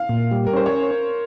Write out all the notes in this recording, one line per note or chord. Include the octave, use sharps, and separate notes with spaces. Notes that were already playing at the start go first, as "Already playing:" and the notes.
Already playing: F5
A#2
G3
A#4
C#4 C5
C#5